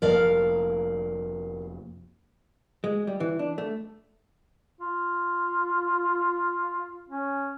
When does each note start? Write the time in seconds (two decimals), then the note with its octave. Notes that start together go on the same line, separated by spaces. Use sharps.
0.02 F1 F3 A#3 A#4 D5 F5
2.84 G#3
3.07 G3
3.20 E3
3.39 D4
3.58 A3
4.81 F4
7.09 C#4